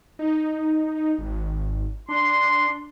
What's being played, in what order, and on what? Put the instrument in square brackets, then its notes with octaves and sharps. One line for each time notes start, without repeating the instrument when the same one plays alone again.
[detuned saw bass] D#4
G#1
[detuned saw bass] D4 [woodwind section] C6